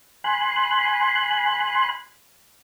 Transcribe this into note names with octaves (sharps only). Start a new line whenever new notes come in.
G#5 B5 C6 F#6